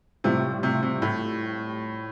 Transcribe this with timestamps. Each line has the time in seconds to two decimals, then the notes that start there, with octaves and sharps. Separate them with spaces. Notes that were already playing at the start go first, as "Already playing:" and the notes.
0.24 A2 C3 G3 C4 F4
0.63 C3
0.83 C3
1.02 A2